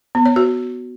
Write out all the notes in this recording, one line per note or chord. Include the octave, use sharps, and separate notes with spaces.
B3
C#5
F#4